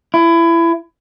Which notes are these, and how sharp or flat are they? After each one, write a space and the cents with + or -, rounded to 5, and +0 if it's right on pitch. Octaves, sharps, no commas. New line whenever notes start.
E4 +25